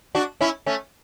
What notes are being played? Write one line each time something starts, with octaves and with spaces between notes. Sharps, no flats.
D4 F#4
C#4 E4
A3 C#4